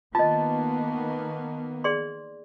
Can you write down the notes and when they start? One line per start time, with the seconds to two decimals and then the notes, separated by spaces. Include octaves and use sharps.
0.15 D#3 A#3 B3 F4 D#5 A5
1.84 G#4 D5 C6